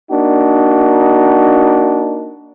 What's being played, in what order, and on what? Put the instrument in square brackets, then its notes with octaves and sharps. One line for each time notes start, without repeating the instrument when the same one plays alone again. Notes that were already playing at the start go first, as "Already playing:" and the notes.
[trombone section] A#3 D4 D#4 F#4